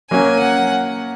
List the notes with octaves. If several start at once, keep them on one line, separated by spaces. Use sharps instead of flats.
F#3 A#3 C#4 G#5
F#5